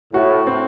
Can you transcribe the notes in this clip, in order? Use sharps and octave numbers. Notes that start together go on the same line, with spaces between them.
A2 F#4
C4